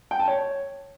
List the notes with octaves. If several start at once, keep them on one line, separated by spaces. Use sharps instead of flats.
G5
A5
C#5